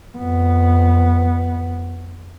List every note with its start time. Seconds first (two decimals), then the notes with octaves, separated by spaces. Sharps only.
0.18 F2 B3